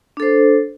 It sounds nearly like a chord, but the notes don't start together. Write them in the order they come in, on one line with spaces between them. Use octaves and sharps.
D4 A4 C5